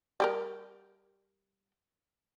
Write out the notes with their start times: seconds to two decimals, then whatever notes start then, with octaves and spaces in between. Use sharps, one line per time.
0.20 G3 G4 A#4